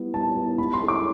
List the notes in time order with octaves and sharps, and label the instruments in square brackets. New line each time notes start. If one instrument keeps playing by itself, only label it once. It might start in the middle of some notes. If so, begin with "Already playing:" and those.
Already playing: [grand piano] G3 B3 E4
[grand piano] G3 [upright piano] A5
[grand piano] B3 E4
[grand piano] G3 [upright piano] B5
[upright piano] C6
[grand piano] C4 E4 A4
[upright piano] D6